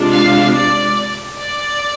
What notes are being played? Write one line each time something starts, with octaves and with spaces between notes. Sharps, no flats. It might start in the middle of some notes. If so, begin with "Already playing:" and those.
Already playing: C3 G#3 D4 F4
F5
D5
D5